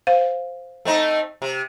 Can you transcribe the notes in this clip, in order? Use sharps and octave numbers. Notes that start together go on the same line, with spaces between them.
C5 F5
A3 C4 D#4
C3